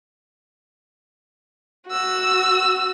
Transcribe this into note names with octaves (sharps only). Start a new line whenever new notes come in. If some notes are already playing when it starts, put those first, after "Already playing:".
F#4 E6